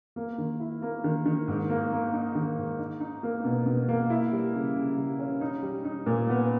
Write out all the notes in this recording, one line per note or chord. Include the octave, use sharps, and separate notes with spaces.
A#3
D#3
E4
A#3
D#3
D#3
G#2
A#3
A#3
D#4
D#3
G#2
D#4
D#4
A#3
B2
B2
A#3
E4
G3
C#3
C#3
G3
C#4
D#4
G3
D#4
A#2
B3